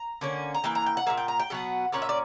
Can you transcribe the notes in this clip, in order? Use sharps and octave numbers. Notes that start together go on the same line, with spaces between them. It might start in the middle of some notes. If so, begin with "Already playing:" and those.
Already playing: A#5
D3 A#3 C#4
A#5
E3 A#3 G5
A#5
G5
F#5
A#2 G3 A#3 E5
G5
A#5
G5
B2 F#3 B3 F#5
A#2 A#3 C#4 F#5
E5
D5